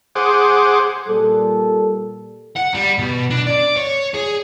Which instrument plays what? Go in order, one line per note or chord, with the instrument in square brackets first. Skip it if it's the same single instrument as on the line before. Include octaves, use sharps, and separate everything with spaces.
[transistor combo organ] G#4 C5 F#5 D6
[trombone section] A#2 G3 A4
[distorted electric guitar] F#5
G3
B2
D4
D5
C#5
G#4